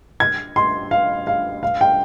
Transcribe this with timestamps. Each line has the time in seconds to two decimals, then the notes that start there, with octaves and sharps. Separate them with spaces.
0.20 G#6
0.56 C6
0.91 F5
1.27 F5
1.63 F5
1.81 G5